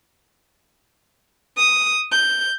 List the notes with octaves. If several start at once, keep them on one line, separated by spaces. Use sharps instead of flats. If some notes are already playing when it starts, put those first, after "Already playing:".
D#6
G6